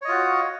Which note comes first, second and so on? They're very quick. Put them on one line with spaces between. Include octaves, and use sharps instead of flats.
C#5 D#5 F4 F#4